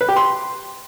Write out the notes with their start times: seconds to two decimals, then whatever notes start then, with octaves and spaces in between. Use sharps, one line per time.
0.01 B4
0.09 G4
0.16 C6